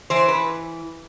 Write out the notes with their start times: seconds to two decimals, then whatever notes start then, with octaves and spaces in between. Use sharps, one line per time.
0.10 E3 C5
0.28 B4